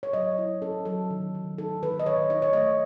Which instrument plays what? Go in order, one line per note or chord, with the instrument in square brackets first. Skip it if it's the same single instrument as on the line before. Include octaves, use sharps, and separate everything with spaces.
[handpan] C#5
F#3 D#5
E4 C#5
C#4 A4
F#3 A4
D#3
D#3
D#4 A4
D#3 B4
D#5
D#3 C#5
D#4 D#5
C#5
A3 D#5